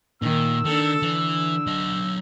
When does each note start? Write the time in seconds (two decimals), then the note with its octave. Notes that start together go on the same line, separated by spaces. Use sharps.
0.22 A#2 D#3 A#3 E6
0.65 D#3 D4 A4
1.02 D3 E3
1.67 F#3 D#5